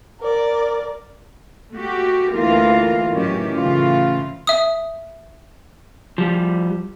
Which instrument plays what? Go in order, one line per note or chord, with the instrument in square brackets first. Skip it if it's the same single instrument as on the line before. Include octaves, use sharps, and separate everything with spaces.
[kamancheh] A#4 D5
[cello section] A3 F#4 G4
D2 E3 A#3 F4 A#4 F5
F#2 A2 D#3 E3 C#4 G4
A2 C#3 E3 F4
[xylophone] E5 D#6
[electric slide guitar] F3 G3